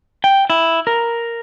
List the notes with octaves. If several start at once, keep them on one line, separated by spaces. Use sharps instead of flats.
G5
E4
A#4